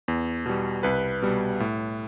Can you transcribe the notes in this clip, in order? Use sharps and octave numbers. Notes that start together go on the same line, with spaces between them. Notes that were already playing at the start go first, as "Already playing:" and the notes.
E2
B2 G3
C2 B4
B2 G3
A2